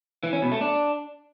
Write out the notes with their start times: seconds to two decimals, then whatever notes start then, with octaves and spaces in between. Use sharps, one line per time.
0.23 E3
0.33 C#4
0.42 B2
0.52 A3
0.61 D4